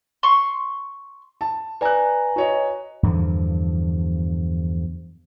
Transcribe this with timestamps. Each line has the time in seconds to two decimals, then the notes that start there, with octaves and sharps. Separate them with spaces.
0.23 C6 C#6
1.41 A5
1.81 B4 D5 G#5 A#5 F#6
2.36 F#4 C#5 D#5
3.03 E2 G2 D3 F3